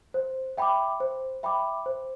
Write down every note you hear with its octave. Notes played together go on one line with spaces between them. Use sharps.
C5
E5 G5 B5 D6
C5
E5 G5 B5 D6
C5